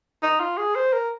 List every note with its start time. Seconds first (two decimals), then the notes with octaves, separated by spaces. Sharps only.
0.22 D#4
0.40 F4
0.57 G#4
0.75 C5
0.93 A#4